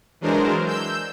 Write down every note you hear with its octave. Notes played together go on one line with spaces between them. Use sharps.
E3 F#3 G#3 D4 A#4 C5
E6 G6